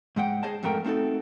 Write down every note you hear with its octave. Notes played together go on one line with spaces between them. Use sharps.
G#2 G#3 F#5 G5
G#4 C5 D#5 A5
F2 G#2 A3 A#4 G5
A3 C4 D#4 F#4 A4